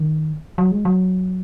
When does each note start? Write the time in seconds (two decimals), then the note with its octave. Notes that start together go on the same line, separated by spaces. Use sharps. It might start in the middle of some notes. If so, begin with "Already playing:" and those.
Already playing: D#3
0.58 F#3
0.71 G#3
0.85 F#3